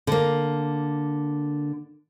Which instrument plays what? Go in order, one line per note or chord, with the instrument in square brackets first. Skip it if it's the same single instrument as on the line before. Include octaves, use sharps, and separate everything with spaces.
[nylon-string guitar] D3 A#3